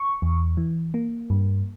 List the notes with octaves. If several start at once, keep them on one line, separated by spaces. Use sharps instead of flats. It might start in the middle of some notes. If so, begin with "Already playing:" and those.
Already playing: C#6
E2
E3
A#3
G2